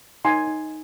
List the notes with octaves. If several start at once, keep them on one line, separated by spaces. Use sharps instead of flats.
D#4 G#5 C6
D#4